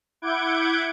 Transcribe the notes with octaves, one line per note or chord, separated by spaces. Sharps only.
E4 F#5 D6 G6 G#6 D7